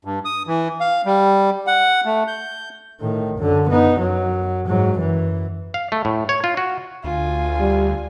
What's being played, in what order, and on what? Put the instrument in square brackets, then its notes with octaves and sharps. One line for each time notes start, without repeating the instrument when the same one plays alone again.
[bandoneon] G2
D#6
E3
F5
G3
F#5
A3
G6
[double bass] A2 D#3
F#2 D3
B3 D#4
F#2 F#3
G#2 F#3
F#2 E3
[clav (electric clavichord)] F5
A3
A2
C#5
F4
F#4
[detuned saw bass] D2 [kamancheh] F4 G#5
[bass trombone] G3